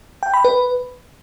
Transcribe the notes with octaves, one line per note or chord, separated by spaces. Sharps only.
G5
B5
B4